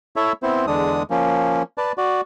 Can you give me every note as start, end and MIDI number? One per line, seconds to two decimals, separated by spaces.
0.16 0.32 64
0.16 0.32 69
0.16 0.32 73
0.16 0.32 76
0.43 0.66 59
0.43 0.66 60
0.43 0.66 64
0.43 0.66 72
0.67 1.03 40
0.67 1.03 50
0.67 1.03 56
0.67 1.03 62
0.67 1.03 87
1.10 1.63 53
1.10 1.63 58
1.10 1.63 61
1.78 1.92 71
1.78 1.92 74
1.78 1.92 81
1.98 2.21 66
1.98 2.21 74